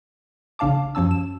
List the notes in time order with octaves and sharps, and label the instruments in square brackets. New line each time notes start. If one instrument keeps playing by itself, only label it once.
[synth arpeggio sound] A#1 C#3 D4 F5 A5 D6
F#2 F3 C#4 A5 E6
E7